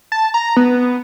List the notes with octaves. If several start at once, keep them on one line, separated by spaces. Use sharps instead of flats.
A5
A#5
B3